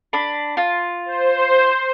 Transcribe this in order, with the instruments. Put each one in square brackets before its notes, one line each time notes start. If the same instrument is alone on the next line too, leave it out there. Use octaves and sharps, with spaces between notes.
[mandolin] D4 B5
F4
[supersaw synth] C5